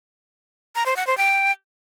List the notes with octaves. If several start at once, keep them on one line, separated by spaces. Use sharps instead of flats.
A#5
C5
F#5
C5
G5